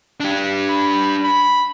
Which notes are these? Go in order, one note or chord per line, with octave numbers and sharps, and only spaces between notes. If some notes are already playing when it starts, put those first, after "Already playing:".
D4 G4
B5
B5